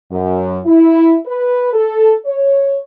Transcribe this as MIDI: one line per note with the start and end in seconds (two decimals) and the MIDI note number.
0.12 0.59 42
0.65 1.16 64
1.26 1.74 71
1.74 2.13 69
2.25 2.80 73